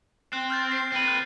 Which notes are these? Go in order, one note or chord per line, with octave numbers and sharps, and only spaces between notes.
C4 F#6
F6 G6 A6
C7
C4 B4
F#6